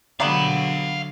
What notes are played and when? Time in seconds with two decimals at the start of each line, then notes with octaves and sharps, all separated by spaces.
0.20 D3 F#3 G3 A#3 B3 F5 B5